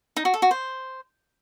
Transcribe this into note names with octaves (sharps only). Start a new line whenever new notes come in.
D#4
F#4
A4
F#4
C5